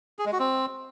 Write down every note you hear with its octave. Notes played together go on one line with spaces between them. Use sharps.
G#4
G#3
F#4
C4